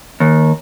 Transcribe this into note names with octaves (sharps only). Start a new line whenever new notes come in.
D#2